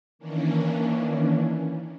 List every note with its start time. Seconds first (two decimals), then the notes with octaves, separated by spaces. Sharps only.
0.19 D#3 E3 A#3 C#4 D4